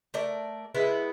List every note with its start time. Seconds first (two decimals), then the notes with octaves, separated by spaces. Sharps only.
0.14 A3 A#4 D5
0.75 G#3 B3 E4